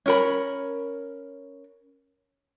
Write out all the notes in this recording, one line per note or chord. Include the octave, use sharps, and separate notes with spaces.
C#4 A#4 B5